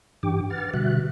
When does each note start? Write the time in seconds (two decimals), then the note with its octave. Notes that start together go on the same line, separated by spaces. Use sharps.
0.23 G2 E3 D4 G4 G5 D6
0.50 B4 F#5 F6 A6
0.74 B2 D3 G3 F#4 E5 F#6